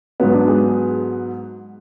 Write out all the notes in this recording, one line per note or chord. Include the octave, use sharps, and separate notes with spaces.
G#2 F#3 B3 C#4
D4
G#4